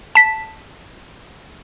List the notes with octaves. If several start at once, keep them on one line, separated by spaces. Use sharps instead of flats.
A5 B6